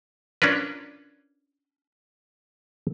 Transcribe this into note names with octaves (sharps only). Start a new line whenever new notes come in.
C#4 D4 F4 A#4 B4